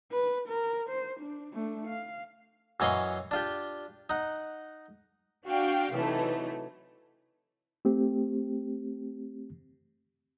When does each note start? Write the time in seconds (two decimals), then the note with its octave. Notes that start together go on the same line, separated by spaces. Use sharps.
0.12 B4
0.48 A#4
0.90 C5
1.20 D4
1.53 A3 D4
1.87 F5
2.80 F#2 E3 C#5 D#5 F5 C#6
3.31 D4 F4 G4
4.10 D#4 F#5
5.47 D4 F#4 F5 G5
5.93 C3 E3 F#3 A3 D#4
7.85 A3 C4 G4